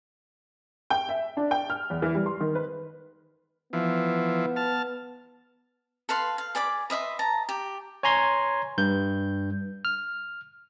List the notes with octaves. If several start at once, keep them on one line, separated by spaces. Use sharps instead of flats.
G5
E5
D4
G5
F6
E2
E3
G3
C6
D#3
B4
E3 F3 B3
A5 F6
A4 B4 F5 C6
F5
G#4 D5 B5 D6
B4 D#5 E5 C6
A5 A#5
G4
C#5 G#5 A#5 C6 G#6
G2 G6
F6